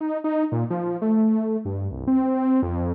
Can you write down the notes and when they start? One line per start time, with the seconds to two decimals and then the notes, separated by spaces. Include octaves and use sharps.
0.01 D#4
0.24 D#4
0.52 A#2
0.70 F3
1.02 A3
1.65 G2
1.91 C2
2.07 C4
2.63 F2